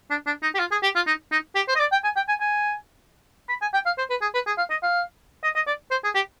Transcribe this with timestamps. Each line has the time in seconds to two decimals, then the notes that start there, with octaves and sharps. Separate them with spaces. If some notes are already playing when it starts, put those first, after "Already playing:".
0.11 D4
0.27 D4
0.43 D#4
0.55 G4
0.59 F4
0.71 G#4
0.83 G4
0.96 F4
1.07 D#4
1.32 D#4
1.56 G4
1.68 C5
1.75 D#5
1.80 D5
1.92 G5
2.04 G#5
2.16 G5
2.29 G#5
2.41 G#5
3.49 B5
3.62 G#5
3.74 G5
3.86 F5
3.98 C5
4.10 B4
4.22 G#4
4.34 B4
4.47 G#4
4.58 F5
4.71 D#5
4.83 F5
5.44 D#5
5.56 D#5
5.67 D5
5.91 C5
6.04 G#4
6.15 G4